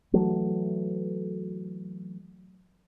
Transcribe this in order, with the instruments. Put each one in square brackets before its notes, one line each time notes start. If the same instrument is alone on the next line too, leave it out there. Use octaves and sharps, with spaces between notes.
[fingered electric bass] E3 F#3 A3